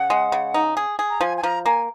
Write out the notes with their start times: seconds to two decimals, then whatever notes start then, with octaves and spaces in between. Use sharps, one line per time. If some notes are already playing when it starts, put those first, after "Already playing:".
Already playing: C#3 F#5
0.10 G#3
0.32 C#3
0.54 D#4
0.77 G#4
0.99 G#4
1.10 A#5
1.21 F3 G#5
1.37 G#5
1.43 F3 A#5
1.66 A#3 G#5